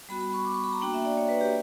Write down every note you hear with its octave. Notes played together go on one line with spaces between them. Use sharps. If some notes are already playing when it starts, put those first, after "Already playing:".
G3 B3 F#4 B5
B5
C#6
D6
C#6
B5
A#5
A#3 D4 F#4 G5
E5
D5
C#5
B4
G4